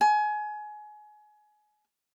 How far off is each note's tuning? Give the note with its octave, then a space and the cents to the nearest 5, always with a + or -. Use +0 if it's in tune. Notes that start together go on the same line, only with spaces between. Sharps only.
G#5 +25